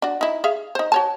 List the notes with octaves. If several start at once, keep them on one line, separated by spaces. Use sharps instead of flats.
D4 F#4
D#4 E4
G#4 E5 F5
D#4 C5
F#4 C#5 A5